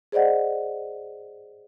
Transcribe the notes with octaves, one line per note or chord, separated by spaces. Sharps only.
G#4 C5 D5 D#5 F#5